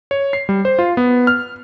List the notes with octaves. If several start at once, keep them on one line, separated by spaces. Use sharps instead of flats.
C#5
C7
G3
C5
F4
B3
F6